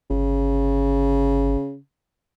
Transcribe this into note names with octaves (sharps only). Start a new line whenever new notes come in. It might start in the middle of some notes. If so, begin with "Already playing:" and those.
G1 C#3